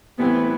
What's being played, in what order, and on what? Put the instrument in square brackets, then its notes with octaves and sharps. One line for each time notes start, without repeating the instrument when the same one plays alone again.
[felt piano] A2 E3 G3 C4 E4 [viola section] B3